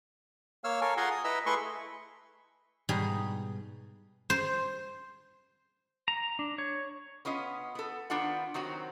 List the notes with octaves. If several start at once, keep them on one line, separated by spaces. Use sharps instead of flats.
A#3 C#5 F5 E6 F6
A4 A#4 C#5 F5 G#5
F4 G#4 F#5 G#5 A#5 C6
D#6
E4 B4 D#5 A#5 E6
A3 E4 G#4 B4 C6 C#6
G#2 B2 G3 D#4 G#4 A#5
C5
A#5
D4
C#5
B3 C#4 F4 D#5
B3 A4
D#3 B3 D4 F4 F#5
D#3 F#3 C4 F#4